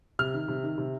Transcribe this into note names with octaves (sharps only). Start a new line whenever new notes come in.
C3 F6
D#3
C3
D#3
C3